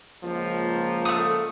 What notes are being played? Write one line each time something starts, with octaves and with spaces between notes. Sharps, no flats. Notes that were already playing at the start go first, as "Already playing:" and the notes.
C#2 F3 A#3
A3 D#6